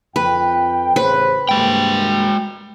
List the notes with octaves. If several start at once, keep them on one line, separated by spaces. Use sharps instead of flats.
F2 B4 G5
A1 C#3 B4 C5
G2 C3 G#3 A#3 G5